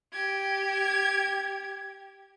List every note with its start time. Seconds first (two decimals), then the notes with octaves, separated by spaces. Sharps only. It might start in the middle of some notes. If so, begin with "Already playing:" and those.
0.13 G4 G#6